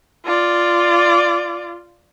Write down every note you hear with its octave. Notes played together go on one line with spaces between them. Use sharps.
F4 D5